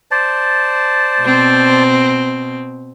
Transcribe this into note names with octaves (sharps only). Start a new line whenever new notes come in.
C5 D5 A5
B2 C4